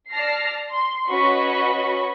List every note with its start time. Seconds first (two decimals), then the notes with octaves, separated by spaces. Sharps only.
0.11 D5 A5 F6 A#6 C7
0.71 C6
1.09 C#4 F#4 B4 D#5 B5 C#6